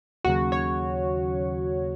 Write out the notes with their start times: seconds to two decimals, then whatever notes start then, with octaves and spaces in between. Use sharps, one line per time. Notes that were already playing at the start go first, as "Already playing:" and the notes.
0.24 D#2 C#3 F#3 F#4
0.52 C#5